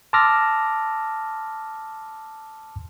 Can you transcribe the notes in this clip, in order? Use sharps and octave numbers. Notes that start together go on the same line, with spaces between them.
A5 C6 D6 E6 F6 A#6